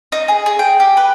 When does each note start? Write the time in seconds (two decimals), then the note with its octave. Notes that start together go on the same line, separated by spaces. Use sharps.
0.12 D#4
0.28 G#4
0.46 G#4
0.59 G5
0.80 G4
0.97 B4